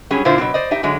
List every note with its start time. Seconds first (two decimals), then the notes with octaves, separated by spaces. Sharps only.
0.11 F#3 G3 C#4 G#4
0.25 A#2 D3 E4 F4 C5
0.38 B2 F#3 C4
0.54 C5 D5 D#5
0.71 D#4 G4 E5
0.83 D3 F#3 G#3